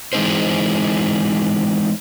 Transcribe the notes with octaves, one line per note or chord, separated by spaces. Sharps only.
E3 G#3 B3 C4 D#4 C5